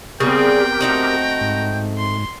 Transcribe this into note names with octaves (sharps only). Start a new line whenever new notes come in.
C#3 G3 B3 C4 G4 G#4 A#4 G5
A3 C4 D#4 F#4 A#5
G#2
C6